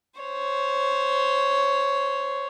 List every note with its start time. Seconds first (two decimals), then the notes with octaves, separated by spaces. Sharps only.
0.19 C5 C#5